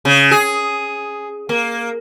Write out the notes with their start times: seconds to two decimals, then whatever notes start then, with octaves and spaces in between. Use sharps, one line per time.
0.05 C#3
0.31 G#4
1.49 A#3